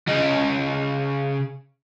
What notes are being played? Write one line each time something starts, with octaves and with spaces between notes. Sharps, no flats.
C#3 D#5